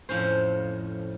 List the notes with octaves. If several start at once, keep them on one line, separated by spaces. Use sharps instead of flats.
F2 A2 C#4 C5